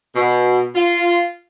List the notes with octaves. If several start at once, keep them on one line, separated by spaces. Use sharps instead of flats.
B2
F4